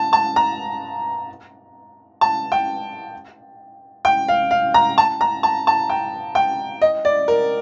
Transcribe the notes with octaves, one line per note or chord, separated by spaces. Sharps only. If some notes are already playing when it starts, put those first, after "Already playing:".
Already playing: A5
A5
A#5
A5
G5
G5
F5
F5
A#5
A5
A#5
A5
A5
G5
G5
D#5
D5
A#4